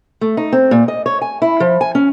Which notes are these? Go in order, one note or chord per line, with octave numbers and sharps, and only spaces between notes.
A3
D#4
C4
A#2
D#5
C#5
G#5
E4
F3
G#5
C#4